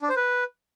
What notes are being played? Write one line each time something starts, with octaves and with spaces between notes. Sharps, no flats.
D4
C5
B4